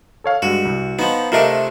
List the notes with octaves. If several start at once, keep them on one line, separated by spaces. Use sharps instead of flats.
A4 C#5 F5
G2 G#3 F#4
C2
F3 B3 D#4
C3 A3 D4 F4 A#4 D#5